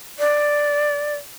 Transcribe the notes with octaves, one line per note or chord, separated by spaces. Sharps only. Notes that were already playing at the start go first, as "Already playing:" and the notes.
D5